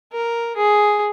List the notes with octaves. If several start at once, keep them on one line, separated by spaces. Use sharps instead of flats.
A#4
G#4